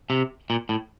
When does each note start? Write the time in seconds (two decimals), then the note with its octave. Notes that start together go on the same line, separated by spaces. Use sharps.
0.10 C3
0.50 A#2
0.69 A2